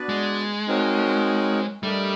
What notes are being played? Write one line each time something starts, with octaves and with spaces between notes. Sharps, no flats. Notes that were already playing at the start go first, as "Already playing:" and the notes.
Already playing: B3 D4 F#4 B4 D5
G#3
C4 D#4 F#4 A#4 C#5
G3 A3 D4 G4 A#4 D#5